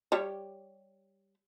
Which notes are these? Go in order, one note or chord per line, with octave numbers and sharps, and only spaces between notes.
G3 G4 C#5